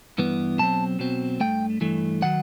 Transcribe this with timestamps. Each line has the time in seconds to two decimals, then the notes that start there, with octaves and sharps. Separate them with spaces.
0.18 G2 E3 B3
0.58 B2 F#3 C4 A5
0.99 B2 F#3 C4
1.40 G2 E3 A3 G5
1.81 G2 E3 A3
2.22 D#3 F#3 F#5